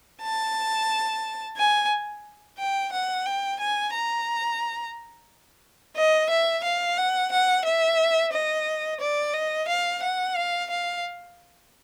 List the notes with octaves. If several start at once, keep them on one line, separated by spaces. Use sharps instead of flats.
A5
G#5
G5
F#5
G5
G#5
A#5
D#5
E5
F5
F#5
F#5
E5
D#5
D5
D#5
F5
F#5
F5
F5